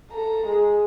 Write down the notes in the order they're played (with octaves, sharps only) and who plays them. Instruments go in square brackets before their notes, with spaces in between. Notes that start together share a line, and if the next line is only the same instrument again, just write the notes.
[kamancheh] A4 A#5
G#3